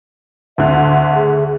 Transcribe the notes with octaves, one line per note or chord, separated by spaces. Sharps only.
D2 D3 E5
G#4